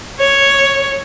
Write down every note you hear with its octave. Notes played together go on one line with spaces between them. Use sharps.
C#5